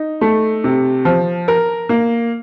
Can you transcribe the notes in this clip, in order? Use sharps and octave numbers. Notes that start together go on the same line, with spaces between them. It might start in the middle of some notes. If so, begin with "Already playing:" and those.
Already playing: D#4
A3
C3
F3
A#4
A#3